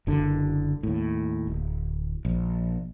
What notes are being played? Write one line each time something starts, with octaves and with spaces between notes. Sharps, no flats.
F#1 D3
D#2 A2
D1
A#1